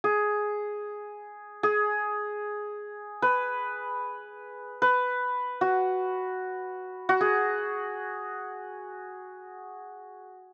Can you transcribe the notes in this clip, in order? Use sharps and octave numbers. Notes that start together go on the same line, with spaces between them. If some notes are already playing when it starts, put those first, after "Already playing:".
G#4
G#4
B4
B4
F#4
F#4
G#4